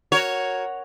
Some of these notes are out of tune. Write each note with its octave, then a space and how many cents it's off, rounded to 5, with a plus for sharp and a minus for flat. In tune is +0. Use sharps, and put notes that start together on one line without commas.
F#4 +0 A#4 +0 C#5 +0